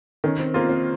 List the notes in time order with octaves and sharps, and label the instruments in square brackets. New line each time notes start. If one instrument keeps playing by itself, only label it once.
[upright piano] D#3 [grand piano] C#4
[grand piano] C4
[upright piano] A#3 F4 [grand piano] C4
[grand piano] C4